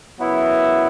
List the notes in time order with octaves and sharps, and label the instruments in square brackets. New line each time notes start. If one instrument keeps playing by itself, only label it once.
[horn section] F#2 C#3 F#3 B3 E4